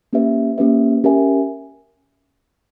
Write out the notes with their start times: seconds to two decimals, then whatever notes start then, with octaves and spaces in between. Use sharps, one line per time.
0.13 A#3 C#4 G4 B4 E5
0.58 A#3 C#4 G4 B4 E5
1.04 C#4 G4 A#4 E5 G#5